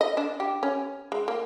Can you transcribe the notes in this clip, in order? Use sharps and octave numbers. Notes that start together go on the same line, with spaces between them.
D#5
D4
G4
C#4
G#3
A#3